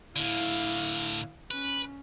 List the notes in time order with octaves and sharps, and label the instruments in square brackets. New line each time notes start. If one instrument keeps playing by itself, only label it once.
[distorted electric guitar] A2 D3 [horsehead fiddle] E4 F5
[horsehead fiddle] C#4 [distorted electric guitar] B4